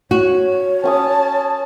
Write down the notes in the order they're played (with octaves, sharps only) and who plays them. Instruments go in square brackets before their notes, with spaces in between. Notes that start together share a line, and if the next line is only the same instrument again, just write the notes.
[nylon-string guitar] F#4 [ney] C#5
[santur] C#4 G#5 D#6 [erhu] A5